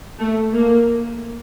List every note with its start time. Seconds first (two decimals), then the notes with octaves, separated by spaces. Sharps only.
0.19 A3
0.53 A#3